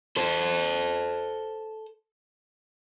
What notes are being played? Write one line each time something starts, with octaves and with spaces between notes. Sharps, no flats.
A4 C5